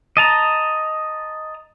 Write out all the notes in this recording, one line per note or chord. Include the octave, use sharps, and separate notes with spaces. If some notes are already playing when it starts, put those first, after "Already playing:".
D#5 A5 A#5